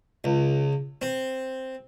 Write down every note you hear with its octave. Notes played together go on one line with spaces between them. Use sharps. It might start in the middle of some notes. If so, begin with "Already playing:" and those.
C#2
C4